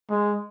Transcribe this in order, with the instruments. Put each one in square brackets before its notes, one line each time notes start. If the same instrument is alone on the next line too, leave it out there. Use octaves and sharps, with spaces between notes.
[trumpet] G#3